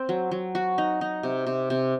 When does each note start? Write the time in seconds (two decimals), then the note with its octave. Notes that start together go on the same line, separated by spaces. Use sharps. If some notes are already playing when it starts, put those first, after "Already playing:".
Already playing: C4
0.09 F#3
0.31 F#3
0.55 F#4
0.78 D#4
1.01 D#4
1.23 C3
1.46 C3
1.70 C3